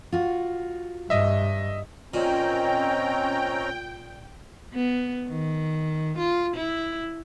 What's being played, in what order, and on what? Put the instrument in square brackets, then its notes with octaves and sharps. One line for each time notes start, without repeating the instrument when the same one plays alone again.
[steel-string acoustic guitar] F4 F#4
[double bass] G2 [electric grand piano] D#5 E5
[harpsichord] A#2 [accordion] C4 C#4 A#5 [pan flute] D#5 [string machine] G5
[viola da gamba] B3
D#3
F4
E4